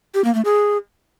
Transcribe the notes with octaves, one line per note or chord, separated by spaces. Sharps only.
G4
A#3
A3
G#4